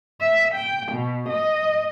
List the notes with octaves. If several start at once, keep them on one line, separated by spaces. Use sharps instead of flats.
E5
G5
B2
D#5